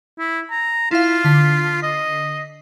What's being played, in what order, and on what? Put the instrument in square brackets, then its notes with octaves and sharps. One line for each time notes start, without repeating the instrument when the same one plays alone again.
[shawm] E4
A#5
[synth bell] E4 F5 [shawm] F4
[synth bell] D3 B6 C7
[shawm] D#5